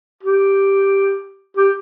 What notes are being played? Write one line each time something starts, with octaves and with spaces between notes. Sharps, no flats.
G4
G4